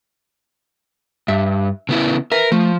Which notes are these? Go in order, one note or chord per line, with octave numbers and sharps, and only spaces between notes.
G2 E5
C#3 B3 E4
A#4 B4 E5
F3 A3